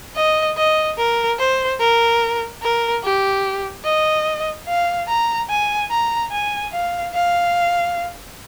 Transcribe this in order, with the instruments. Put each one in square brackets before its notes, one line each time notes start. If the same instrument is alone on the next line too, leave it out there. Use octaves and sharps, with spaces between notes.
[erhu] D#5
D#5
A#4
C5
A#4
A#4
G4
D#5
F5
A#5
G#5
A#5
G#5
F5
F5